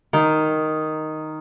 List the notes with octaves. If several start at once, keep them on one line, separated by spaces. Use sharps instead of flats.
D#3